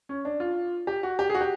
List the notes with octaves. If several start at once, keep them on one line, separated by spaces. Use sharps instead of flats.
C#4
D4
F4
G4
F#4
G4
G#4
F#4
G4